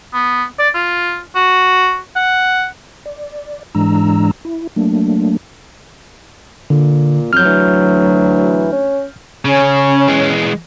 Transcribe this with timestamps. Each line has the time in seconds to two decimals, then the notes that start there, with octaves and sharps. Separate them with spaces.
0.13 B3
0.59 D5
0.74 F4
1.35 F#4
2.15 F#5
3.06 D5
3.75 G#2 E3 G#3 D4 A#5 E6
4.45 E4
4.76 F#3 A3 A#3 D4
6.70 A#2 D3
7.33 F2 F#3 F6 G6
7.45 D2 E3
8.73 C#4
9.45 C#3 C#4
10.08 E3 G#3